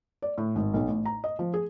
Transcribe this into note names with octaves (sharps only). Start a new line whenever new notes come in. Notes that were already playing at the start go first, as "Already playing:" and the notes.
D5
A2
G#1
B1
A1
A#5
D#5
F3
G#4